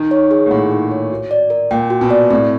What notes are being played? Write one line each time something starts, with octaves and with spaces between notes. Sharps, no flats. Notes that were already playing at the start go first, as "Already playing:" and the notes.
Already playing: D#3 D#4
C#5
G#4
A#2
A2 F#5
D#4
C#5
F#4
D5
A#4
A#2 G5
F#4
B2
D5
A2 C4